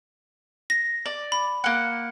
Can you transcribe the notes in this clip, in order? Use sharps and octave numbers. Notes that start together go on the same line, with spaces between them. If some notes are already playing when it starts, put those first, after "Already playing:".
A#6
D5
B5
A#3 F#5